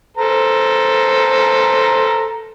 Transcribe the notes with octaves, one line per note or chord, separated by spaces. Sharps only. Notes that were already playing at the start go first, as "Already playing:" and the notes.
A4 C5 A#5